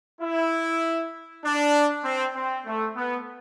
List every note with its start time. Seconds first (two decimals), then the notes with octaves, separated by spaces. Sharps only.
0.21 E4
1.43 D4
2.04 C4
2.35 C4
2.65 A3
2.95 B3